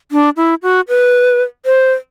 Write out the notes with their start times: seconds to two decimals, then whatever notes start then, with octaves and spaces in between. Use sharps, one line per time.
0.12 D4
0.37 E4
0.63 F#4
0.88 B4
1.66 C5